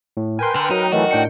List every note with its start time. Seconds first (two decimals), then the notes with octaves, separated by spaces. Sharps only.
0.17 A2
0.39 A#4 B4 G5 G#5 C6
0.55 D3
0.71 F#3 D#4
0.92 D#3 E3 A3 F#4
1.11 A2 D4 G5 C#7